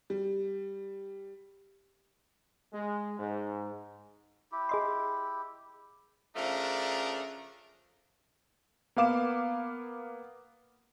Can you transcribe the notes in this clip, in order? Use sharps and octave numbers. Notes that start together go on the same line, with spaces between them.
G3
G#3
G#2
E4 G4
G#4 D#5 C6
C#3 F3 A3 D4 A#4
A#3 B3 F5 D6 E7